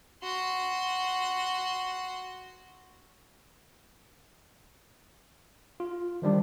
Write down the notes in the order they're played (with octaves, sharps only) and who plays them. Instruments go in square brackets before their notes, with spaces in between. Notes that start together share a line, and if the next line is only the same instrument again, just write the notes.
[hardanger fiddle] F#4 C6
[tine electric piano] F4
D#3 F3 G3 D4